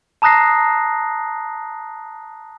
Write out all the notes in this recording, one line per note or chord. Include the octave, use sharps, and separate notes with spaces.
A5 A#5 D#6 F#6 A#6 C7